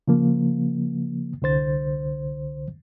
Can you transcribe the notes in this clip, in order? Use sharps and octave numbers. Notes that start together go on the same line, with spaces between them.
C#3 F3 A#3
C2 D3 C5 A6